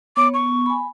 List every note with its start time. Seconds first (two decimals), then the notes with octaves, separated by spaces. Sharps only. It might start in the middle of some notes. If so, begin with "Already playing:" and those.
0.17 B3 C#5 D6
0.34 B3 C#6
0.66 G#5 B5